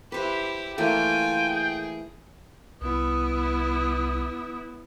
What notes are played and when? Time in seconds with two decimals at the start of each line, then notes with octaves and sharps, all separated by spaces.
0.12 E4 G4 B4 C5
0.78 E3 A3 A#3 F4 G5 G#5
1.49 G#4
2.81 C2 B3 E4 D#6